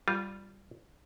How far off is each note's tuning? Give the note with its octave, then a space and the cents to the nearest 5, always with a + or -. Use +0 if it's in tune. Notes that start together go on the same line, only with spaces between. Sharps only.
G3 +0 F4 +0